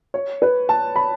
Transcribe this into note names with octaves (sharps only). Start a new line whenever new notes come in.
C#5
B4
A5
B5